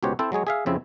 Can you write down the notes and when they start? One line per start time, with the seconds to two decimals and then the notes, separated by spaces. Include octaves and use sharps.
0.03 C#2 B2 F#4 G4 C5 C#5
0.19 C4 E4 A4 C5
0.32 F#3 G#3 G#4 C#5
0.47 G#4 E5 F5
0.66 F2 C#3 C4 E4